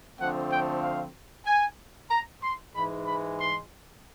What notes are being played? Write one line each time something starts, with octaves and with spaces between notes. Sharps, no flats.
D3 F3 A3 C4 F#5
G5
F5
G#5
A#5
C6
G#2 E3 G#3 B5
B5
C6